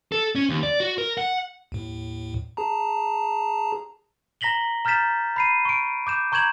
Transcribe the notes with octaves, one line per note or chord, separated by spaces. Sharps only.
A4
C#4
D#2
D5
F#4
A#4
F#5
D#2 A2
G#4 A5 A#5
A#5 A#6 B6 F#7 G7
A#5 F6 G6 A6 B6 E7
B5 C7 D#7
C#6 D7
D6 G6 E7
A#5 C#6 G6 G#6 E7 F#7